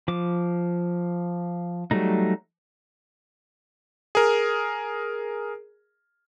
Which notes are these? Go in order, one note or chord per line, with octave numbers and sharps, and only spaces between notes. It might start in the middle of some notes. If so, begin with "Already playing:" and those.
F3 D6
F#3 G3 A3 D#4
G#4 A#4